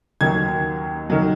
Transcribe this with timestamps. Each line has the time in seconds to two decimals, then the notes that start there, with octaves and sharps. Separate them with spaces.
0.21 D#2 D#3 F#3 G#6
1.10 D#3 F#3